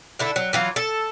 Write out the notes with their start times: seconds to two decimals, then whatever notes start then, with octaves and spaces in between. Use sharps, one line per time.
0.19 D3 E4 A4
0.36 F#3
0.53 E3 F#3 F4
0.76 A4